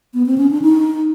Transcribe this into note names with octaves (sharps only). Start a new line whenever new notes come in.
B3
C4
C#4
D4
D#4